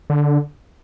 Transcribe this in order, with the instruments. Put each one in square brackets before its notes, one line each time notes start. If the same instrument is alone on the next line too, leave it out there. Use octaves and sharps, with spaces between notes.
[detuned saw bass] D3